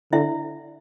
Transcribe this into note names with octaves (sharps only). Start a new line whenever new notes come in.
D3 E4 E5